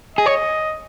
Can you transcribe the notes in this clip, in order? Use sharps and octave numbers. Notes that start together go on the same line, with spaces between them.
G#4 D#5
C#5